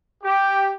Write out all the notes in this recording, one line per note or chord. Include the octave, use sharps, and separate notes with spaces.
G4